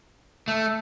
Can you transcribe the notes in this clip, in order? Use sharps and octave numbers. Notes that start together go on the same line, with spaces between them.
A3